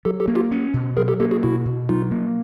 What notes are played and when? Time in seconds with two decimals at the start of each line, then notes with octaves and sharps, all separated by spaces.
0.05 F#3 G4 A4
0.20 G4 A4
0.28 A#3
0.35 F4 G4
0.51 C#4
0.74 B2
0.97 F#3 G#4 A#4
1.08 G4 A4
1.20 A#3 G4 A4
1.31 F#4 G#4
1.43 B2 E4 F#4
1.66 B2
1.89 F#3 D#4 F4
2.11 A#3